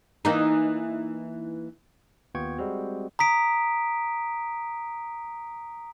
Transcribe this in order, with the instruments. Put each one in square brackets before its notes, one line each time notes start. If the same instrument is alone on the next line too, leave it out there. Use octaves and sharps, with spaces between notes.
[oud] E3 A#3 D#4
[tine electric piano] D#2 B3 F4 G5 C#6 G#6
G3 G#3 C4 F#4
[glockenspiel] A#5 D#6 B6 D7